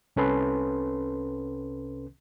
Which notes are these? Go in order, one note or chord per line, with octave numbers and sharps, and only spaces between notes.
C2 C3 C#4 A4 B4 C6